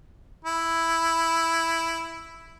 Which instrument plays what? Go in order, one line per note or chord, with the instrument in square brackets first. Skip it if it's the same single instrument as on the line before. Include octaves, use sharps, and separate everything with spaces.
[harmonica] E4